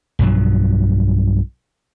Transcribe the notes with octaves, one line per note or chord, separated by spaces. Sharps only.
B1 G2 F3 F#3